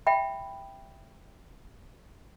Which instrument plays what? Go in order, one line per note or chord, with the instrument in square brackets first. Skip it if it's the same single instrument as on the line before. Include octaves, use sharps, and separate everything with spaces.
[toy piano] E5 G5 B5